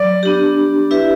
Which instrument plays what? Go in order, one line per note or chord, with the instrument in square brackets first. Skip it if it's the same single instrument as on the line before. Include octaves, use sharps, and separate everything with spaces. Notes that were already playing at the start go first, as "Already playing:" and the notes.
Already playing: [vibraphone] F#3 [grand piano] D5
[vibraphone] B3 D4 G4
E4 G4 B4 E5